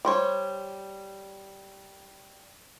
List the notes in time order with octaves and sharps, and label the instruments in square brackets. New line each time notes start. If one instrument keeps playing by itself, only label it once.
[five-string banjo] G3 C5 C#5